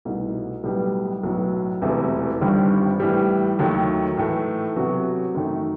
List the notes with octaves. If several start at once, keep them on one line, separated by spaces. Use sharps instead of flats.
C2 B2 A3 D#4
B1 A2 G3 B3
B1 A2 F#3 B3
E1 E2 C3 E3 A3
G1 G2 D#3 G3 C4
A2 E3 G3
D#2 D#3 F#3 A3
A2 E3 A3
C3 F#3 B3 F#4
F#2 D#3 A3 D#4